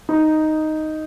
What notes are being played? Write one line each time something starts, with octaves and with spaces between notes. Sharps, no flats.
D#4